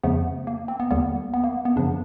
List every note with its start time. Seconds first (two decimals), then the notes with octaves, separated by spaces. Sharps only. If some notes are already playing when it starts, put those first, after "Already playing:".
0.03 F2 C#3 F3 A3 B3
0.47 A#3
0.68 C4
0.80 B3
0.91 D#2 D3 G3 A#3 B3
1.34 B3
1.44 A#3
1.65 B3
1.76 F#2 C#3 F3 D4